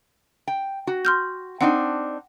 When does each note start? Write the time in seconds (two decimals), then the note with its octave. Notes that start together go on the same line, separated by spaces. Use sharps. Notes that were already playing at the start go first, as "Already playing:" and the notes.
0.48 G5
0.87 F#4
1.05 C6 F6 G6
1.61 C4 D4 D#4 F#5 G5